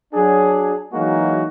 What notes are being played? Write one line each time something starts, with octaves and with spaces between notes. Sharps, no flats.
F#3 D4 G#4
E3 F#3 G#3 A#3 D#4 F#4